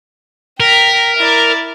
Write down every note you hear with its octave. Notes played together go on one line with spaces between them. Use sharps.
A#4 G5 B6
E4 D5